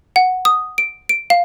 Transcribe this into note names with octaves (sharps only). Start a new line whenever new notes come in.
F#5
D#6
D7
D7
F5